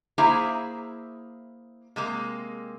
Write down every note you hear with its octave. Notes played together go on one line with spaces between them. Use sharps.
A#3 E4 G#4 C5 E5 A#5
C3 G#3 A#3